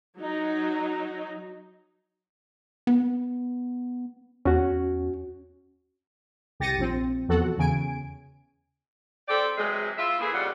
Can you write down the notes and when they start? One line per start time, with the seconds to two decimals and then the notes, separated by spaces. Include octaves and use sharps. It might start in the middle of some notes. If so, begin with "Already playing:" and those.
0.18 F#3 D#4
2.87 B3
4.45 E2 C#4 F#4
6.60 C2 G4 A6 A#6 C#7 D#7
6.78 A#1 F3 C4
7.28 E2 B2 F3 F#4 A4 F#5
7.58 E2 C#3 G#5 D7
9.27 C4 G4 A4 D5
9.57 C3 E3 F#3 G#3
9.98 F4 E5
10.18 C#3 E3 A3 A#3 E4 G#4
10.33 F2 C#3 G3 F4 F#5